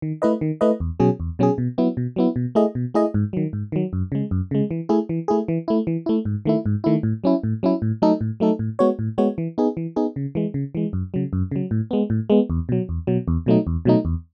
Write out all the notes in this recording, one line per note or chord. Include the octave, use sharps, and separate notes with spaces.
D#3
A3 E4 B4 D#5
D#3
A3 E4 B4 D#5
E2
B2 F#3 C#4 G#4
E2
B2 F#3 C#4 G#4
B2
F#3 B3 E4
B2
F#3 B3 E4
B2
A3 E4 G#4 D#5
B2
A3 E4 G#4 D#5
G#2
D#3 F#3
G#2
D#3 F#3
F#2
C#3 G#3
F#2
C#3 G#3
E3
A3 E4 G#4
E3
A3 E4 G#4
E3
A3 E4
E3
A3 E4
G#2
D#3 A3 E4
G#2
D#3 A3 E4
A2
F#3 C#4 E4
A2
F#3 C#4 E4
A2
F#3 A3 D#4 A4
A2
F#3 A3 D#4 A4
A2
G#3 B3 F#4 C#5
A2
G#3 B3 F#4 C#5
E3
B3 D#4 G#4
E3
B3 D#4 G#4
C#3
E3 G#3
C#3
E3 G#3
F#2
C#3 F#3
F#2
C#3 F#3
A2
G#3 B3
A2
G#3 B3
E2
B2 F#3
E2
B2 F#3
E2
B2 F#3 A3 D#4
E2
B2 F#3 A3 D#4
E2